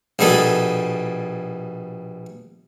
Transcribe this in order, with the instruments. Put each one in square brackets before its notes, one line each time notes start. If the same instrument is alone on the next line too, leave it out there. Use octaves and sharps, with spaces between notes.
[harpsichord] A#1 B2 G3 G#4 A4